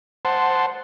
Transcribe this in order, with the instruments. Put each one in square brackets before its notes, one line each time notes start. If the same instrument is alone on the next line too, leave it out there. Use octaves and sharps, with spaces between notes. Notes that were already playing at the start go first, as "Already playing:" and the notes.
[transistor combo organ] C5 F#5 A5 C6